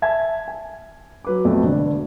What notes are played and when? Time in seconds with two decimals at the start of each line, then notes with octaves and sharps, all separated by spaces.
0.02 E5 G#5 A5 G#6
0.48 G#5
1.25 F#3 B4 D6
1.45 B1 F2 A3
1.63 E1 D3 D4